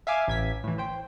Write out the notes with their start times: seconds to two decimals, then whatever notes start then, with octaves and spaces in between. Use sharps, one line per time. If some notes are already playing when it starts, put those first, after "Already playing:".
0.07 E5 F5 G#5 D6
0.28 A1 G#6 B6
0.64 A2 E3
0.78 C5 G5